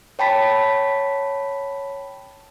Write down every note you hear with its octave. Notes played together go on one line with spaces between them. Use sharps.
C#5 G5 A5 B5 B6